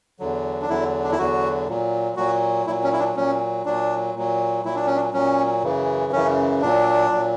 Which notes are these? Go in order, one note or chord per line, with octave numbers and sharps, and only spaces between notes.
E2 D3 F#3
D4
E2 D3 F#3 E4
D4
E4
E2 D3 F#3 F#4
A#2 F#3
A#2 F#3 F#4
A#2 F#3 E4
C#4
E4
D4
A#2 F#3 C#4
A#2 F#3 D4
A#2 F#3
A#2 F#3 E4
D4
C#4
D4
A#2 F#3 C#4
F#2 C#3 E3
F#2 C#3 E3 C#4
A#2 F#3 D4
A#2 F#3